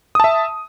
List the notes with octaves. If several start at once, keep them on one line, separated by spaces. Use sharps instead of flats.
E5 A5 D#6